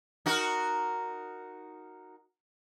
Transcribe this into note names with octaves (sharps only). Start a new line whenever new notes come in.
D#4 F#4 A#4